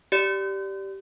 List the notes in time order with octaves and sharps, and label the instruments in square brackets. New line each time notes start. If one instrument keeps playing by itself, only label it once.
[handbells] G4 D5